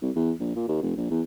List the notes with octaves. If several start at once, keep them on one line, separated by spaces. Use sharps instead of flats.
C2
E2
A#1
A#2
D#2
F1
A#1
E2